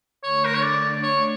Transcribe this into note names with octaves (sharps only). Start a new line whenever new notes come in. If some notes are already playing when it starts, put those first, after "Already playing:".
D3 A3 D4 C#5
A#4
C#5
D5
C#5